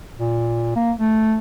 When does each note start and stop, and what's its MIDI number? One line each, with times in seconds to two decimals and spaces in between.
0.18 0.70 46
0.75 0.92 58
0.97 1.37 57